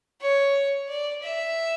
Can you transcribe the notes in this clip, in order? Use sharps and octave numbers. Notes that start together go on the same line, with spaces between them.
C#5
D5
E5